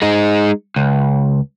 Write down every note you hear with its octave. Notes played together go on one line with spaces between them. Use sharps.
G#3 D#4
C#2